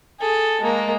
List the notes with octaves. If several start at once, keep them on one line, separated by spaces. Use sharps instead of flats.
G#4 A4
G#3 A#3